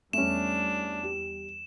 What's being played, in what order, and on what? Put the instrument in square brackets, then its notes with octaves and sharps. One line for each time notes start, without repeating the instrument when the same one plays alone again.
[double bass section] E2 G3 [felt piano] A3 C#4 [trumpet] D4 [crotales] E7
[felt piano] G4